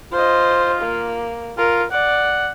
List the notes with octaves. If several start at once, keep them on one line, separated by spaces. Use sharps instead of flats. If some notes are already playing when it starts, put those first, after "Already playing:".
F4 C5 D#5
A#3
F4 A#4
D5 F#5